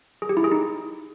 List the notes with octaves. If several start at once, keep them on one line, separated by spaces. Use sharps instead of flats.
G#4
G4
E4
G#4
D#4